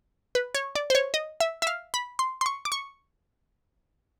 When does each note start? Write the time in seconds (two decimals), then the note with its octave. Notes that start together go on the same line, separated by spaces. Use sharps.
0.35 B4
0.55 C#5
0.75 D5
0.90 C5
0.95 C#5
1.14 D#5
1.40 E5
1.62 E5
1.67 F5
1.94 B5
2.19 C6
2.41 C6
2.46 C#6
2.65 D6
2.72 C#6